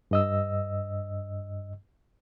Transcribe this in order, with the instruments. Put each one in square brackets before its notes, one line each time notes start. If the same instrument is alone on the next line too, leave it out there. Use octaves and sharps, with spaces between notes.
[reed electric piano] G2 D#5 E6